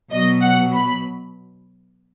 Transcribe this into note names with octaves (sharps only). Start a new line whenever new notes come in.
B2 F#3 D#5
F#5
B5